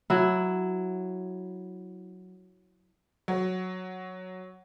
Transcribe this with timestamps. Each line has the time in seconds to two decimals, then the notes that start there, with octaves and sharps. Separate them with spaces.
0.10 F#3 E4
3.28 F#3